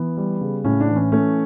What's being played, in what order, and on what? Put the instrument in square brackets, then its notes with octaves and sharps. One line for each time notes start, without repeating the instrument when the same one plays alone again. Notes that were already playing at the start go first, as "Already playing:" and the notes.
Already playing: [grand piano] E3 B3
G3
C#3
A2 C#4
D4
E3
C#4
A3 C#4